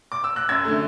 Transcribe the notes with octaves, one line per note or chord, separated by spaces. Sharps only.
D6
E6
F#6
F#2 E6 G#6
D3 A3